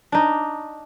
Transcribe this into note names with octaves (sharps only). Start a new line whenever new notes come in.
D4 D#4